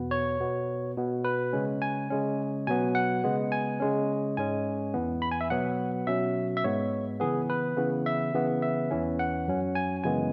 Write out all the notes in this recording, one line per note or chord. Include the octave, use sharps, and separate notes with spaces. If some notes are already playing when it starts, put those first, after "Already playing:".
Already playing: E2 B2 B3
C#5
B2 B3
B2 B3
B4
C#3 G#3 C#4
G#5
C#3 G#3 C#4
B2 F#3 B3 G#5
F#5
C#3 G#3 B3
G#5
C#3 G#3 C#4
G#2 G#3 C#4 G#5
E2 E3 B3
B5
G#5
E5
B2 F#3 B3 F#5
B2 F#3 C#4 E5
E5
G#2 G#3 B3 C#5
C#3 E3 B3 G#4
B4
C#3 E3 B3
E5
C#3 E3 B3
E5
E2 E3 C#4
F#5
F#2 F#3 C#4
G#5
F#2 C#3 E3 G#3 B3 G#5